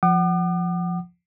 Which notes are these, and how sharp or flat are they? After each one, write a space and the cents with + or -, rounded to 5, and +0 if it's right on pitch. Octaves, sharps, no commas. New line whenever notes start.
F3 +0 F#5 +30 D6 +45